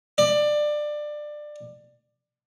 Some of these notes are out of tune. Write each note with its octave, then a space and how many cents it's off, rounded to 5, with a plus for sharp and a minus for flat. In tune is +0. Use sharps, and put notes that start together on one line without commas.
D5 +20